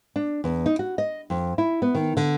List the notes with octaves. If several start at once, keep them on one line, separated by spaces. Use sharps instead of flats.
D4
E2
D#4
F#4
D#5
F2
E4
B3
D#3
D3